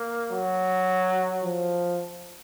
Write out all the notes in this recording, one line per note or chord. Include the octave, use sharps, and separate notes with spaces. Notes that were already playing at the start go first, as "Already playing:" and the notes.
Already playing: A#3
F#3
F3